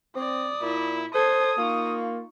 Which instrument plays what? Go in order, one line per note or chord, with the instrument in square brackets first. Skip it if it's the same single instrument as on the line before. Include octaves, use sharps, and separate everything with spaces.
[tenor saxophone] C4 [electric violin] D5 D#6
[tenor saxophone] A#2 [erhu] E4
[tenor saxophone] A4 [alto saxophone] C5 [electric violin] A5 G#6 [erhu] D#6
[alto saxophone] A#3 [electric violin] D#4 C#6 [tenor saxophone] F4